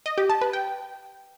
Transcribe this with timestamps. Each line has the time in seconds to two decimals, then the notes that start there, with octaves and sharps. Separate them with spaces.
0.06 D#5
0.18 G4
0.30 A5
0.41 B4
0.53 G5